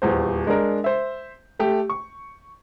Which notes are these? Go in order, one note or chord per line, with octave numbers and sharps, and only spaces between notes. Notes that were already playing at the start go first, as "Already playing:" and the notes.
D#1 E2 C5
G#3 D4 A#4
C5 E5
A3 G4
C#6